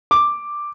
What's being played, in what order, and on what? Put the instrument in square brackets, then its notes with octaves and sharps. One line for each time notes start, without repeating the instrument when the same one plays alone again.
[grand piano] D6